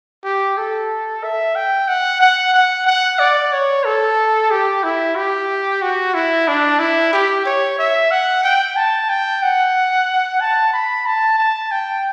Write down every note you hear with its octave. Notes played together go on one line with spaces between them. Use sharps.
G4
A4
E5
G5
F#5
F#5
F#5
F#5
D5
C#5
A4
G4
E4
G4
F#4
E4
D4
E4
G4
C#5
E5
F#5
G5
A5
G5
F#5
A5
B5
A5
A5
G5